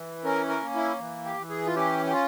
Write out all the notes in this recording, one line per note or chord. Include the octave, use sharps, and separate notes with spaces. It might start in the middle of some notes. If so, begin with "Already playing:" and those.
Already playing: E3
C#4 A#4
A#4
A#3
E4
E3
G4
E3
G#4
F4
C#4 G4
G4
F4